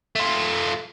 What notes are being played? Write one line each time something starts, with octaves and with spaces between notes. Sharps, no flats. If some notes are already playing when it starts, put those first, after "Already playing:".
A3 F4